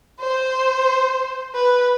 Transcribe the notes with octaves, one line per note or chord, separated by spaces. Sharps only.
C5
B4